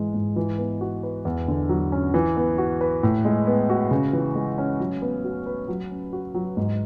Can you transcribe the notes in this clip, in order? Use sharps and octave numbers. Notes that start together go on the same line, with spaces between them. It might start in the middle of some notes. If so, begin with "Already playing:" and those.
Already playing: G#2 E3 G#3
G#2
E3
B3
F#4
B4
E2
D3
F#3
C#4
E3
B3
F#4
B4
A2
G#3
B3
F#4
C#3
E3
G#3
C#4
F#3
B3
F#4
B4
F#3
C#4
F#4
F#3
G#2